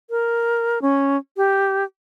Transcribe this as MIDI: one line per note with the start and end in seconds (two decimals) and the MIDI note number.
0.10 0.79 70
0.82 1.17 61
1.37 1.84 67